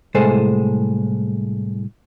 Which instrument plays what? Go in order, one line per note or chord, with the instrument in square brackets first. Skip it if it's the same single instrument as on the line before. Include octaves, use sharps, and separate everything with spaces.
[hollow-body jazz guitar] C2 A2 G#3 G#4 A4 C5